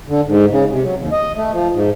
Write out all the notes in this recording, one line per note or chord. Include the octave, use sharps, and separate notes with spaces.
D3
G#2
C#3
C3
F#3
D#2
D#5
A3
F3
G#2